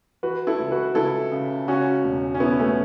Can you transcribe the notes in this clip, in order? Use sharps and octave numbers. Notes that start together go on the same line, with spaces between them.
E3 F#4 B4
E4 A4
C#2
F#4 B4
C#2 E4 A4
C#3
C#3 C#4 F#4
E1
C#4
E3 B3 E4
A3 C#4